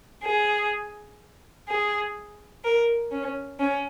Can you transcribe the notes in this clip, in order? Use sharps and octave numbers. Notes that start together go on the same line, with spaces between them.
G#4
G#4
A#4
C#4
C#4